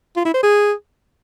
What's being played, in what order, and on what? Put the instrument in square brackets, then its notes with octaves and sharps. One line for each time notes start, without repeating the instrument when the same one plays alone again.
[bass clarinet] F4
E4
C5
G#4